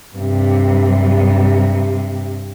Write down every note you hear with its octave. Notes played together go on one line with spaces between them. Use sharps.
G2 C3